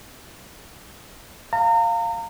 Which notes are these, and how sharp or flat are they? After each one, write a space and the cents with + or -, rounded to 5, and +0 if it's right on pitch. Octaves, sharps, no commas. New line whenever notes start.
F5 +0 A#5 -35